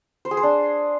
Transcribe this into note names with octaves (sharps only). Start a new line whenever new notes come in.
C5
G#4
C5
D4